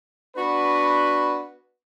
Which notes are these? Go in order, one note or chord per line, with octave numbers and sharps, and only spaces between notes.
B3 D4 F#4 B4